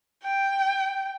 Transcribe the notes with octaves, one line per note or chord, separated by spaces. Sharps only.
G5